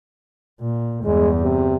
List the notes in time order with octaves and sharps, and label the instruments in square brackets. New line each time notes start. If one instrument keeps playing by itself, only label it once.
[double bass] A#2
[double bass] E2 G2 [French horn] G#3
[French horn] C3